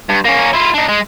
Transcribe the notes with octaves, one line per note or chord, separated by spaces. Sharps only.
G2
A#3 C#4
E4 F4
D4 D#4
G#3